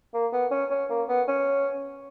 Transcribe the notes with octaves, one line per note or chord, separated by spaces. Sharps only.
A#3
B3
C#4
C#4
A#3
B3
C#4